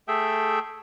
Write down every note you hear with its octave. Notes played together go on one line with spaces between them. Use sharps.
A3 G#4 A4 E5 G5